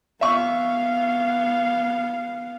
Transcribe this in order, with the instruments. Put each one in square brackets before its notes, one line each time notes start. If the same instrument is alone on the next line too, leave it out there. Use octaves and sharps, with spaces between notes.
[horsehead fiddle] B3 F5 [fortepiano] E5 C#6